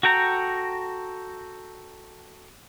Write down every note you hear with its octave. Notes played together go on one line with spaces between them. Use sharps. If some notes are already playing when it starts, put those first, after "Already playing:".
F#4 A4 G5 A#5